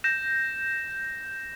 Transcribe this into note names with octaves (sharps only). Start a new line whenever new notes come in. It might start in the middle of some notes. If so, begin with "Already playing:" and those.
G6 A#6 E7